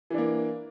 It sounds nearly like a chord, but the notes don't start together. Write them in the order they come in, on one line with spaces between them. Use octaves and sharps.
E3 D4 A#3